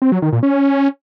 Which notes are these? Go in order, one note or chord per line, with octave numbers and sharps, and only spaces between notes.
C4
F#3
D#3
A#2
C#4